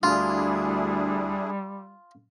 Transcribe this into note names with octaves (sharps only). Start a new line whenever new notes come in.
D2 G3 D4 E4 F4 G#4